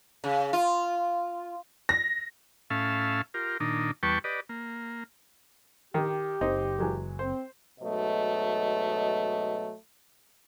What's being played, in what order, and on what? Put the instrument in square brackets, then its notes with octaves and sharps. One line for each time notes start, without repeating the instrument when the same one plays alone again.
[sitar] C#3
F4
[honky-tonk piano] A#6
[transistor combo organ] A2 C#4 E5 F5 A5
F4 G4 A#4
A#2 D#3 D4 D#4
E2 G3 B4 G5 A5 C#6
G4 B4 D5 D#5
A#3
[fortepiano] D#3 [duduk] G4
[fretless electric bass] F#1 [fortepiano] C4 D#4
[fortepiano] E3 F#3 G#3
[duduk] C4 [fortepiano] C5
[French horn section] G#2 B2 F#3 A3 D#5